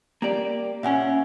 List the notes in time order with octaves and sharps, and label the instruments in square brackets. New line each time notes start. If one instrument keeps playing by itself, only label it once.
[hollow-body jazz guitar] A#3 G4 D5
[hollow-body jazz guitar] A#2 C#4 [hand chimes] E5 F#5 G#5